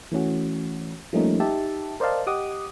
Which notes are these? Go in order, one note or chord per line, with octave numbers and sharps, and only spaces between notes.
E3 A3 C#4 F#4
F3 G3 A3 A#3 C#4 D#4
D#4 G4 E5 A5
A#4 C5 D5 D#5 F5 A5
G4 D#5 F#5 D6 D#6